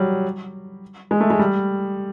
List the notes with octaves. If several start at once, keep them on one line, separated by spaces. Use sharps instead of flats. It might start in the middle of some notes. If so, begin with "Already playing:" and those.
Already playing: F#3 G3
G#3
A3
G#3
G3